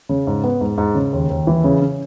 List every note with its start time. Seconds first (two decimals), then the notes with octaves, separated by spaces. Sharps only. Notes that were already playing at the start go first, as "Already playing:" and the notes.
0.09 C#3
0.27 G#2
0.44 B3
0.61 G#2
0.78 G#2
0.95 C#3
1.13 D#2
1.30 D#2
1.47 E3
1.64 C#3
1.81 C#4